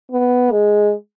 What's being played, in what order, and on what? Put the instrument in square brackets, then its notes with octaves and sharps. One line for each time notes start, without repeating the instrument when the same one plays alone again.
[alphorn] B3
G#3